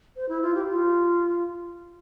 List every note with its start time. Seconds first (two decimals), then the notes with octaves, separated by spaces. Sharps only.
0.16 C5
0.29 E4
0.42 F4
0.55 G4
0.68 F4